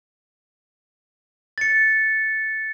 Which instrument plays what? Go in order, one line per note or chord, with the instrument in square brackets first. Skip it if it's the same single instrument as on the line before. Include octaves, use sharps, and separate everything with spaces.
[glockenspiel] A6 C#7